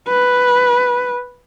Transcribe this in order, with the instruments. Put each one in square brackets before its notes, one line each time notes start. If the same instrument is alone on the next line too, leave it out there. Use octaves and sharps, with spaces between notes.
[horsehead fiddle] B4